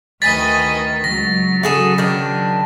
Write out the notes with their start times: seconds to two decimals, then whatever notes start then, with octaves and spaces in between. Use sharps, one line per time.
0.22 D2 D#3 B4 D#5 G#5 A6 B6
1.04 C#2 F#3 A#6
1.63 C#3 F#4 G#4 A4
1.98 D#3 D4